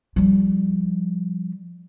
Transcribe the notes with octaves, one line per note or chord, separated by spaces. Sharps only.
F3 G3